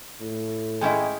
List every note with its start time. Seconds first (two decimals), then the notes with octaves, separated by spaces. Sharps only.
0.21 A2
0.81 G#3 C#4 E4 D#5 G5